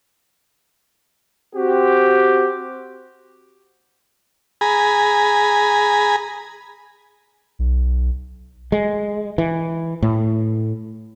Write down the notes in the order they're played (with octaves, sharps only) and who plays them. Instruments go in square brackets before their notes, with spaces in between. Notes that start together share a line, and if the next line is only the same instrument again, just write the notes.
[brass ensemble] C4 F#4 G4
[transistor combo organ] G#4 G#5 A#5 B5
[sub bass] B1
[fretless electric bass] G#3
E3
A2